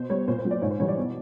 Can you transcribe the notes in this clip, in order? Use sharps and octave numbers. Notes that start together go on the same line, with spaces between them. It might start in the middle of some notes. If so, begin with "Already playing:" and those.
Already playing: B2 C5
G3 C#5
A#2 C5
C5
F#3
D5
G#2 C#5
C5
E3 G3 C#5
D5
B2